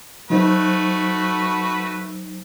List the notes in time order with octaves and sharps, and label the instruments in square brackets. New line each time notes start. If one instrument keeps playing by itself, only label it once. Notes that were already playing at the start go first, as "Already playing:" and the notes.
[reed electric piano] F#3 D#4 C5 [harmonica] A3 F#4 B4